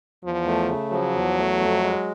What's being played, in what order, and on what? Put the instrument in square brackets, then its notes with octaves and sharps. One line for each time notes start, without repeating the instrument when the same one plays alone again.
[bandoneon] E2 [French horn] F3
[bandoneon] A3
C#3
[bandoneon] F3 [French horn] F#3
[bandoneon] E2
A3
F2
G#3